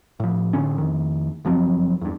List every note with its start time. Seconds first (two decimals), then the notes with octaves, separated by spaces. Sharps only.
0.20 A2 F3
0.53 A2 D3 C#4
0.78 F2 D#3
1.45 F#1 F3 F#3 C4
2.01 E2 G2